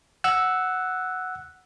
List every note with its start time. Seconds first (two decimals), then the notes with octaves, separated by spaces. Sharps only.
0.24 F#5 E6 F#6